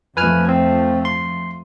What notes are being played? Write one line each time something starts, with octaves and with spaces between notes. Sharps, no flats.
F2 F3 A3 B4 G#5 F6
C4
C6